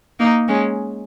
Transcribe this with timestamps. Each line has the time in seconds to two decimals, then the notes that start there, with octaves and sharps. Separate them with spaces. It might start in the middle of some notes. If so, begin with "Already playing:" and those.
0.19 A#3 D#4
0.48 G#3 C#4